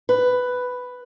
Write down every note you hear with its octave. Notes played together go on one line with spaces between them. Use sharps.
B4